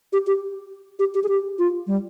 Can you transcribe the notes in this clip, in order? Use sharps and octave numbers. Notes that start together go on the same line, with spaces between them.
G4
G4
G4
G4
G#4
G4
F4
G3